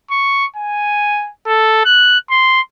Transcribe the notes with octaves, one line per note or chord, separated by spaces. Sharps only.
C#6
G#5
A4
F#6
C6